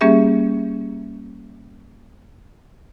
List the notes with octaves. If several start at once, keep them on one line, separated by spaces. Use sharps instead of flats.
G3 A#3 C#4 G4 G#4 E5